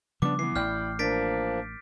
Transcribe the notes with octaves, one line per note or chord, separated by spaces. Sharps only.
C#3 F3 G3 B3 D4 D6
E3 B3 C7
A1 E4 D5 G5 F6 G6
F3 A#3 D4 A#4 A6 B6 D7